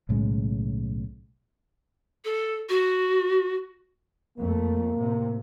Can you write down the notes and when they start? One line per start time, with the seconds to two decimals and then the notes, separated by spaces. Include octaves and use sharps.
0.09 B1 A2 C#3 G#3
2.25 A4
2.69 F#4
4.38 F2 A3 A#3
4.96 A2 C3